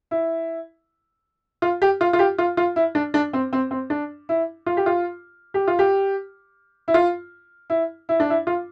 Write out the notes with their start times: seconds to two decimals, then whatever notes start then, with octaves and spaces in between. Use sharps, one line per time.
0.11 E4
1.62 F4
1.82 G4
2.01 F4
2.13 F4
2.19 G4
2.38 F4
2.57 F4
2.76 E4
2.95 D4
3.14 D4
3.33 C4
3.53 C4
3.71 C4
3.90 D4
4.29 E4
4.66 F4
4.77 G4
4.86 F4
5.54 G4
5.68 F4
5.79 G4
6.88 E4
6.94 F4
7.70 E4
8.09 E4
8.20 D4
8.30 E4
8.47 F4